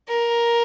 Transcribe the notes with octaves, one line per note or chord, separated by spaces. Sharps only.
A#4